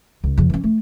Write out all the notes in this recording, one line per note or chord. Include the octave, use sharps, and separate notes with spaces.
C#2
F2 C#3
E3 C#4
A3